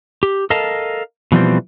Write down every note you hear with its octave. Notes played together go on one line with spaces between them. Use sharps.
G4
A4 A#4 D#5 F5 A5
B2 E3 F3 G3 A3 C4